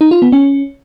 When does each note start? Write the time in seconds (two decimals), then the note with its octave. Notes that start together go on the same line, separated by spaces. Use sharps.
0.01 D#4
0.11 F4
0.22 B3
0.32 C#4